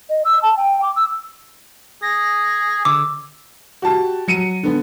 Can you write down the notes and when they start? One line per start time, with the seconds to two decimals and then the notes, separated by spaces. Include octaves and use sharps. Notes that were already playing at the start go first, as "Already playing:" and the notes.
0.10 D#5
0.25 E6
0.42 A5
0.57 G5
0.82 D6
0.96 E6
2.02 G#4 A#6
2.85 D3 D6 E6
3.82 F#4 G4 A5
4.28 F#3 C#7 D#7
4.63 D3 B3